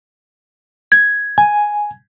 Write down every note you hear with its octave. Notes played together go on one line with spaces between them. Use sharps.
G#6
G#5